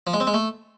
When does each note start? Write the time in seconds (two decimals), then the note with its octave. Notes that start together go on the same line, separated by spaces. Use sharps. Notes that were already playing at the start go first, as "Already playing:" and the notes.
0.07 F3
0.14 G#3
0.20 C4
0.27 G#3
0.34 A3